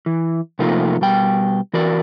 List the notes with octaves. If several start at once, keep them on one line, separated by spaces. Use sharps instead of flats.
E3
C3 F3 A3 A#3 D#4 F4
B2 G3 G5
E3 F#4 A#4 D5